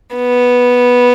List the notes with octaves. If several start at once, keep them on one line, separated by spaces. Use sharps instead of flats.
B3